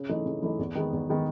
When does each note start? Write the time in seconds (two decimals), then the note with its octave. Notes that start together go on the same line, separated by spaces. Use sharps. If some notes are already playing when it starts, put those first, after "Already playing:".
Already playing: C#3
0.09 E3 A3 D#4
0.26 C#3
0.42 E3 A3 D#4
0.59 E2
0.75 D#3 G#3 B3
0.93 E2
1.09 D#3 G#3 B3